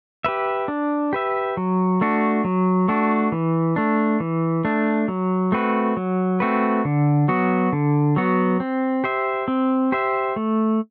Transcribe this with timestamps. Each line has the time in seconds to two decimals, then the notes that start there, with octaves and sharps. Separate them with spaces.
0.25 G4 B4 E5
0.68 D4
1.13 G4 B4 E5
1.57 F#3
2.01 A3 D4 F#4
2.44 F#3
2.88 A3 D4 F#4
3.32 E3
3.76 A3 D4
4.20 E3
4.65 A3 D4
5.08 F#3
5.52 A3 C4 F#4 B4
5.97 F#3
6.40 A3 C4 F#4 B4
6.85 D3
7.28 F#3 B3 F#4
7.73 D3
8.16 F#3 B3 F#4
8.60 C4
9.04 G4 C5 E5
9.48 C4
9.92 G4 C5 E5
10.36 A3